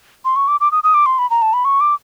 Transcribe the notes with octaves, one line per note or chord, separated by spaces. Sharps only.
C6
C#6
D6
D6
D#6
D#6
D6
C6
B5
A#5
A5
B5
C#6
D6